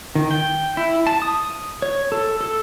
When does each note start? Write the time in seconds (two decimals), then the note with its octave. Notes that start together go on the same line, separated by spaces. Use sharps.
0.15 D#3
0.31 G5
0.77 E4
1.07 A5
1.22 D#6
1.82 C#5
2.12 A4
2.41 A4